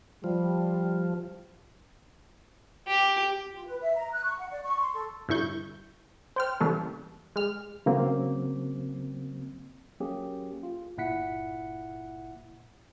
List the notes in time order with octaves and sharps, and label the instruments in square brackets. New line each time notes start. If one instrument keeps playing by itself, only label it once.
[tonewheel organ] F3 [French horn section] G3
[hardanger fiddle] G4
[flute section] F4
B4
E5
A#5
F#6
C#6
F#5
D5
C#6
C6
A4
[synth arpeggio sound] G2 D3 E4 C#6 G6
C5 G5 F6
C#3 E3 G3 A#3 A4
G#3 F6
[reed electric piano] C#3 F#3 A#3 C4
[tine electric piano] F#3 A#3 C#4 G4 G#4
F4
G1 A#2 E4 F#5 B6 C#7